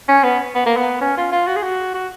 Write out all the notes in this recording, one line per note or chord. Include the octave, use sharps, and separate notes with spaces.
C#4
B3
B3
A#3
B3
C#4
F4
F4
F#4
G#4
F#4
F#4